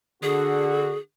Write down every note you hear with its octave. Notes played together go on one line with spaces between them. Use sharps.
D3 F#4 G#4